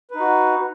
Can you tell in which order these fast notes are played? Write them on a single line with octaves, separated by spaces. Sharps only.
B4 D#4 F#4